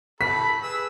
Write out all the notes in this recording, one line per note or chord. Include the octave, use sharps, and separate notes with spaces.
A4 B5 B6
G#4 B4 E6